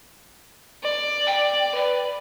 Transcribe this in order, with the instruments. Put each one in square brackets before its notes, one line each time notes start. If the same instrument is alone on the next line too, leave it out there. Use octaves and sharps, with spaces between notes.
[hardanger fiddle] D5
[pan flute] G5
[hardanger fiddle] B4 [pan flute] D5